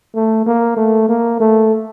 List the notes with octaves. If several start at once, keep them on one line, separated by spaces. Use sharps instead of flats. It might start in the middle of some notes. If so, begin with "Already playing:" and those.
A3
A#3
A3
A#3
A3